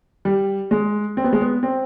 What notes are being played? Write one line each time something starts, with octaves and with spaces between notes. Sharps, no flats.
G3
G#3
C4
B3
G#3
B3
C4